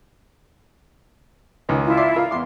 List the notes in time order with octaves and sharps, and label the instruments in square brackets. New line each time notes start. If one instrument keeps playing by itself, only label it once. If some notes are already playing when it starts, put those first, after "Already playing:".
[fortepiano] C#2 D#3 C#4
[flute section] E4 F4
[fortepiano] D5 C6 D6
[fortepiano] F4 A#4 B5 [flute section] F5
[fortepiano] E2 C6 D6